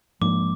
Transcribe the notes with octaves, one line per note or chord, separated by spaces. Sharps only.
G#2 F3 A#3 D4 D6